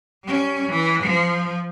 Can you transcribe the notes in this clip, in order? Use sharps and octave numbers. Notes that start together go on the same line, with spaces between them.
G3 C#4
E3
F3